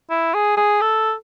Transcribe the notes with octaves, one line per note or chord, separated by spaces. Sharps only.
E4
G#4
G#4
A4